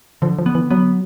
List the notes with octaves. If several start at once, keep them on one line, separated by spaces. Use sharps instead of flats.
D3 F3
F3
B3
E3
F#3 B3